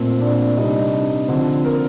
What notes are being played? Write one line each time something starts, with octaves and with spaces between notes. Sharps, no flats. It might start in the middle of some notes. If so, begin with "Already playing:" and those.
Already playing: A#2 A3 C4
D4 D5
C3 G3 D4 D#4 D#5
D4 D5
D3 F3 C4 C5
A#3 A#4